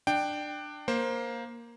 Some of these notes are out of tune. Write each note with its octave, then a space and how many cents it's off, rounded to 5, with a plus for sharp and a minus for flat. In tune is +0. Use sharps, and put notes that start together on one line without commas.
D4 +20 G5 +0
A#3 +10 C5 +10